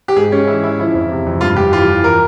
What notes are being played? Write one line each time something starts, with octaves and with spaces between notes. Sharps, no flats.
G4
G#2 G#4
G#2 C#4
E3 E4
E3 E4
F3 E4
F2
C3
F2
G2 F4
G2 G4
E3 F4
E3
A#4